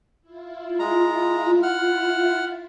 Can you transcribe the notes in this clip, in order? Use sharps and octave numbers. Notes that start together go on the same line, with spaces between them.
E4 F4
G#3 A#5
F#5 F6